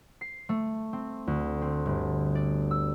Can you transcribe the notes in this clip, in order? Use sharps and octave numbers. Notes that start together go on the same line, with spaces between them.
C7
A3
C4
D2
C4
G1
D5
E6